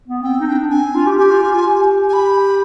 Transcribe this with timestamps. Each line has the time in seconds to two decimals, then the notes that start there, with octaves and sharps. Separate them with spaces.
0.08 B3
0.23 C4 G5
0.40 D#4
0.47 D4
0.71 C4 G#5
0.83 D4
0.95 F4
1.06 G4
1.18 G4 G#5
1.30 F4
1.42 F4
1.54 F4
1.67 G4
2.09 G#5
2.14 B5